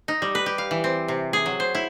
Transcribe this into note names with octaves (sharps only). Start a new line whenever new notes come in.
D#4
G3
B4
G4
F5
E3
C4
C3
G#4
F#3
C5
E4